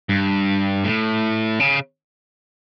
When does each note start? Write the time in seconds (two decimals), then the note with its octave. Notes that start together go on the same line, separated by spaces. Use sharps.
0.09 G2
0.84 A2
1.60 C#3